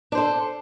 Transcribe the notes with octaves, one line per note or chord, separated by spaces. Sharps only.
D4 A4 C5